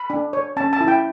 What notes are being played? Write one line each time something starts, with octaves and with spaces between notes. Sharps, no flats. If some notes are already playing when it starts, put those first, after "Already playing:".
Already playing: B5
D4
C#5
C#4 A5
A5
E4
G5